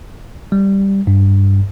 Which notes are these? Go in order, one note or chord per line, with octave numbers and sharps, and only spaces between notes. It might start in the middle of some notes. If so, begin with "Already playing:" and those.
G3
G2